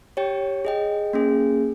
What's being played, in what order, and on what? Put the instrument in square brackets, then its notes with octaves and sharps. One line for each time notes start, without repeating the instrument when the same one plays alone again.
[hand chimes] G4 C#5 G5
G#4 D#5 G5
A#3 C#4 G#4